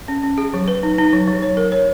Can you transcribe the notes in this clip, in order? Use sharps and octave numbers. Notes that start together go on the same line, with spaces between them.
C#4
C#4
G#4
F#3
B4
D#4
D#4
F#3
F#3
C#5
A#4
C#5